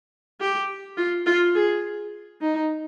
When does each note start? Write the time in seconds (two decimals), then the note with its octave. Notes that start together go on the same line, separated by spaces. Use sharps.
0.41 G4
0.97 F4
1.26 F4
1.55 G#4
2.41 D#4